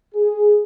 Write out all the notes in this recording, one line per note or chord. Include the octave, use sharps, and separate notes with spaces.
G#4